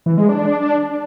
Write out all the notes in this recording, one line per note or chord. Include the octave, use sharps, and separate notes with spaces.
E3
G#3
D4